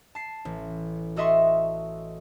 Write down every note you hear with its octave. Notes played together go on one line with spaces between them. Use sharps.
A5 C7
A1
F#4 A4 D#5 E5 C6 C#6